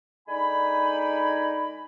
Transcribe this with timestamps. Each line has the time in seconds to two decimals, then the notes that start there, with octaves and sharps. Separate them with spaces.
0.28 D3 G#3 D#4 D5 G#5 B5